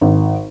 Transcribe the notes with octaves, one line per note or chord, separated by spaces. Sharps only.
G#1